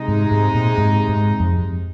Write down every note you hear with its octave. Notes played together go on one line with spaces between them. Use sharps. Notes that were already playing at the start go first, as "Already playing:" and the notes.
Already playing: C3 G#3 D#4
G#2
G#2
A#2
G#2
G#2
F2